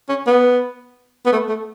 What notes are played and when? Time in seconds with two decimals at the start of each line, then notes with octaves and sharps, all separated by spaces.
0.09 C#4
0.27 B3
1.26 B3
1.32 A3
1.49 A3